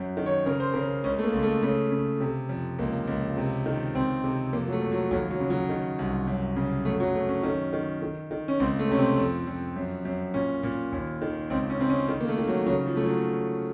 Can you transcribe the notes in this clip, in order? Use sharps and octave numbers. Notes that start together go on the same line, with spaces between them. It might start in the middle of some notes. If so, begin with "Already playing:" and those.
Already playing: F#2
D#3
C#5
C#3 A#4
C5
C#3 A#4
C#2 C#4
A3
A#3
C#2
A3
C#3 A3
C#3
C3
F2
C#2 A#3
C#2
C3
D#3
C#2 C4
C3
F2 A#3
F#3
A3
F2
F#3
D#2 F#3
F#3
C#3
F#3
D#3
C2
F#2
C#3
F#2 A3
F#3
F#2 A3
C#4
D#3 C#4
D#3
D#3
D#3
C#4
C#2 C4
A3
C3 C#4
C4
F2
F2
F#2
F#2
A#2 C#4
A#2
D#2
D#3
C#2 C4
C#4
C#3 C4
C#4
D#3
A#3
A3
D#3
F#3
C#3 F#3
F3
C#3 A3
F#3